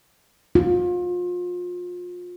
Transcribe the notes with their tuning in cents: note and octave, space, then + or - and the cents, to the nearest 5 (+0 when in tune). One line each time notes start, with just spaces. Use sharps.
F4 +30